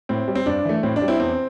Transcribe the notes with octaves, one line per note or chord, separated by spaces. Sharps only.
A2 C4
G3
C4
G2 D4
E3 A3
A2 C4
D4
G3
C4 E4
E2 C4